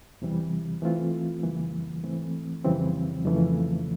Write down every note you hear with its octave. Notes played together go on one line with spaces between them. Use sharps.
E2 C3 E3 G3
E3 A3 C4 F4
F2 C#3 E3 G3 A#3
G#2 E3 A3 C4
F2 C#3 E3 G3 C4
F2 C#3 E3 A3 C#4